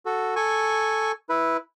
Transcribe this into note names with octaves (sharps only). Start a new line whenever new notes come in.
F#4 A4
A4 G#5 C#6
E4 B4